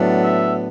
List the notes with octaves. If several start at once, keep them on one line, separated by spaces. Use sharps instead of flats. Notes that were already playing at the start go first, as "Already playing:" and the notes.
Already playing: A2 F#3 B3 D4
E5